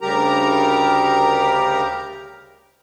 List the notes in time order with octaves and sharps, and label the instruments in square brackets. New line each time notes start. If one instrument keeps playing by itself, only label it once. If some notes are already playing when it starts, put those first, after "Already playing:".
[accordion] D2 C#3 G3 G4 A#4 A#5